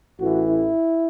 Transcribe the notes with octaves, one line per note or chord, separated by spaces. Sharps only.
A1 A2 E3 F#4
E4